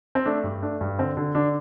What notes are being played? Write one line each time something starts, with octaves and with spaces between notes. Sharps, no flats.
C4
A3 D4
G2
A3 D4
G2
D3 C4
D3
D3 D4